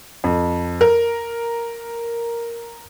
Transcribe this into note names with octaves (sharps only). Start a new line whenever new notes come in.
F2
A#4